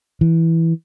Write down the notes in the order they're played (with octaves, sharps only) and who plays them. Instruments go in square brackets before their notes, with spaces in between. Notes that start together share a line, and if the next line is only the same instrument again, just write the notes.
[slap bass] E3